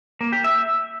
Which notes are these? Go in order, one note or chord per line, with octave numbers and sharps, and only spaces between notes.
A#3
G4
E5